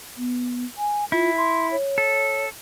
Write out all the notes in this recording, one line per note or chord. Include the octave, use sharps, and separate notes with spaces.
B3
G#5
E4 F4
C6
C#5
A4